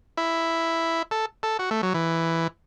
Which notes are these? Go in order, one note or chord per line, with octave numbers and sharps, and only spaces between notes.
E4
A4
A4
F#4
A3
F#3
E3